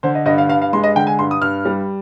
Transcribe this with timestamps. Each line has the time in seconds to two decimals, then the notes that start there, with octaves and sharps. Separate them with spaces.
0.03 D3 C5
0.15 D#5
0.26 G2 D#5
0.38 F5
0.49 G2 F5
0.62 F5
0.73 G#3 C6
0.84 D#5
0.96 D3 G5
1.07 G#5
1.19 G2 C6
1.31 D#6
1.42 G2 F6
1.65 G3